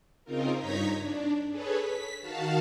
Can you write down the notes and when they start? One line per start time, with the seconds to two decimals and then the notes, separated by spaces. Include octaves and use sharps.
0.25 C#3 C4 D#4 F4 A#4
0.57 G2 D#4 C#5 A#5 G#6 B6
0.99 D4
1.49 G#4 A4 B4 C#5
1.79 B6
2.20 D#3 F#4 F5 A5